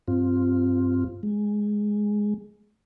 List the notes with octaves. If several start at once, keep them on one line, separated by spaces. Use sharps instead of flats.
G2 C4 F4
G#3